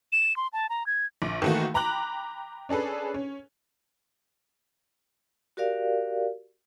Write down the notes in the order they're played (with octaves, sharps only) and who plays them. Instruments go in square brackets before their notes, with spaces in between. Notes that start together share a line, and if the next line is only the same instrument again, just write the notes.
[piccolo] E7
C6
A5
A#5
G#6
[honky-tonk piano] A#1 D6
D#3 E3 A3 A#3 F#4
G5 A#5 B5 D6 F#6 F#7
C#4 D4 G#4 A4 B4
C#4
[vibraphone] F#4 G4 A#4 D5 F5